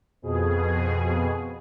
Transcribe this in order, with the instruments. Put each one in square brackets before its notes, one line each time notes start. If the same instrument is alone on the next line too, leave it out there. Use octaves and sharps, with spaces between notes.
[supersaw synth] F2 B2 G#4